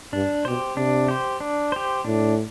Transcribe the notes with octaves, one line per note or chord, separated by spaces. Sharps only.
G2 D4
B2 G4 C5
C3 D4
G4 C5
D4
G4 C5
A2 D4